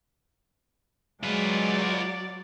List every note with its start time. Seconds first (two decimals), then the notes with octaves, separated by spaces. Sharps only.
1.23 F#3 G#3 F4 B4 D5